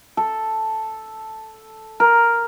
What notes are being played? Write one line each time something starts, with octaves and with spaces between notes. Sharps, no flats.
A4
A#4